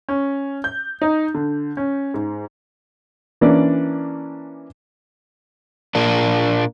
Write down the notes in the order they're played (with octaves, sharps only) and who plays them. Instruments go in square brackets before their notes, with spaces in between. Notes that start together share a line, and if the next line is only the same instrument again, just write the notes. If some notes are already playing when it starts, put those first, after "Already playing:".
[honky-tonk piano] C#4
G6
D#4
D3
C#4
G#2
[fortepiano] E3 A#3 C#4 D4 D5
[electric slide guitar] A#2 A#3 D4